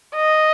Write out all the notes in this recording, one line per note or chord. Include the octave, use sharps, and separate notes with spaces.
D#5